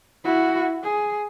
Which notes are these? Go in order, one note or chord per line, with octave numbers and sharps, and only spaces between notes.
E4 F#4
G#4